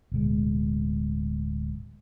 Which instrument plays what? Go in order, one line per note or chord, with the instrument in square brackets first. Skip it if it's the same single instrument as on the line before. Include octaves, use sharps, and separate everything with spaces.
[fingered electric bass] D1 B2 G#3